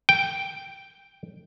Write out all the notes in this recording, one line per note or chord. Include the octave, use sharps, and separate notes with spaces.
G5